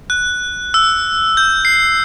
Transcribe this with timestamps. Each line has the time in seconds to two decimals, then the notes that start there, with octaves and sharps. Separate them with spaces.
0.10 F#6
0.74 E6
1.37 G6
1.65 C7